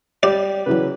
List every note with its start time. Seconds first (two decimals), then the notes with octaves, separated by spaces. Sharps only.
0.23 G3 D5
0.66 C#3 E3 F#3 B4